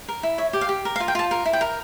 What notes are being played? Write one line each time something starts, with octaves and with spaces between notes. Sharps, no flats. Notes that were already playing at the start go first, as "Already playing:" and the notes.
A#4
E4
C#5 E5
G4
F5
G4
A#4
F5
F4
G5
F4 A5
A#4
E4
G5
A#4